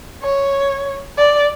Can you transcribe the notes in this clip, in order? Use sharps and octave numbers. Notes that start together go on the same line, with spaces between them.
C#5
D5